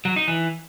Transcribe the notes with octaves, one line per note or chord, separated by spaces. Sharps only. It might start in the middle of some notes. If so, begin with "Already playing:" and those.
F#3
D#4
E3